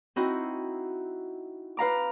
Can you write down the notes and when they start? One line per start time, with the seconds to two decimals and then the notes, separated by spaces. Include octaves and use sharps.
0.16 C4 D#4 E4 F#4
1.77 B4 F5 A#5 D6